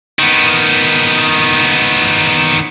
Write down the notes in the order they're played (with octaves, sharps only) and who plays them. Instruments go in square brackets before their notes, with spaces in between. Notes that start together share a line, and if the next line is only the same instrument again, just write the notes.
[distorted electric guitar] D#3 B3